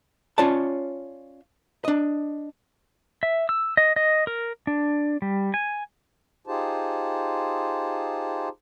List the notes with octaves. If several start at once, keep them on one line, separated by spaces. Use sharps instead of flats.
C#4 F4 C#5 D5 A5
D4 D#5
E5
E6
D#5
D#5
A#4
D4
G3
G#5
D#4 F4 G4 G#4 C5 A5